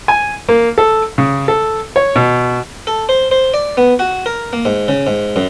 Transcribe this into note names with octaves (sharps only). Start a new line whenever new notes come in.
G#5
A#3
A4
C#3
A4
C#5
B2
A4
C5
C5
D5
B3
F#4
A#4
A#3
G#2
C#3
G#2
F#2